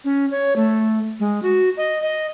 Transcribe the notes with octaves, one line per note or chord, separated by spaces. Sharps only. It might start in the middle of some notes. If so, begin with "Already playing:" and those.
C#4
C#5
A3
G#3
F#4
D#5
D#5